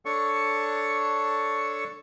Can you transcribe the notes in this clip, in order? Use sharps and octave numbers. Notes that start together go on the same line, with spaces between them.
D4 A4 C#5 C#6